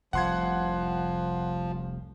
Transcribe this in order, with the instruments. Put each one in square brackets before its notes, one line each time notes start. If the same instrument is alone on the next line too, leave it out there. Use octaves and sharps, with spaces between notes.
[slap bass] F1 C2 [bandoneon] F3 [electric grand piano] F#5 C6 G#6